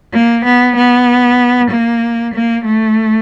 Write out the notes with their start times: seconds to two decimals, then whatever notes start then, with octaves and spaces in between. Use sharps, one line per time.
0.13 A#3
0.45 B3
0.76 B3
1.70 A#3
2.34 A#3
2.65 A3